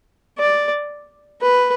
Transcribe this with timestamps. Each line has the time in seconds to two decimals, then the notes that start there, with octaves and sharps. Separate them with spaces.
0.39 D5
1.41 B4